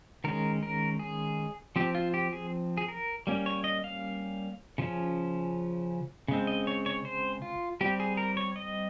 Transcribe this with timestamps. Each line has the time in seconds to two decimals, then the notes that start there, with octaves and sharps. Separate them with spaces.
0.24 D#3 G#3 C#4 A#4
0.63 A#4
0.99 G#4
1.76 F3 C4 G4
1.95 F4
2.14 G4
2.33 G#4
2.77 G#4
2.88 A#4
3.27 G3 A#3 C#4
3.46 C#5
3.64 D#5
3.84 F5
4.78 C#3 F3 C#4
6.28 C#3 G#3 C4
6.47 D#5
6.67 C#5
6.86 C#5
7.05 C5
7.42 F4
7.81 G3 C4 G4
8.00 G#4
8.17 A#4
8.37 C#5
8.56 D#5